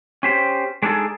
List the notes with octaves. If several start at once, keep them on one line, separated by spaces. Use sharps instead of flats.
C#4 G4 C5
G#3 D4 D#4 G#4 A4